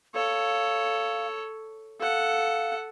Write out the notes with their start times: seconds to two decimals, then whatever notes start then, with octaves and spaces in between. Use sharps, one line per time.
0.15 A4 C#5 F5
2.00 A4 F5 F#5